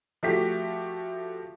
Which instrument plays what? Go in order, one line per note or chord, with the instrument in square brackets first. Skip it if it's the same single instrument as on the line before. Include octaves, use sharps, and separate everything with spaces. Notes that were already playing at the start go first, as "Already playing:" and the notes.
[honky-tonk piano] F3 A3 F#4 G4 B6